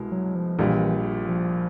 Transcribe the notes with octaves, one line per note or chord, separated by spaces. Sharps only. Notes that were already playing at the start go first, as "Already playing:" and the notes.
Already playing: C2 B2 G#3
F#3
F3
A#1 A#2 E3 G3
F3